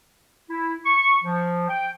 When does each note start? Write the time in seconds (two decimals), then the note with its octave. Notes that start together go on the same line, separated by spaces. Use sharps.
0.50 E4
0.85 C#6
1.24 F3
1.68 G5